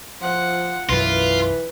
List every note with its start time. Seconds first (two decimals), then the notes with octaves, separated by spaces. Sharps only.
0.21 F3 F4 F#5
0.89 B1 F#2 E3 F4 B4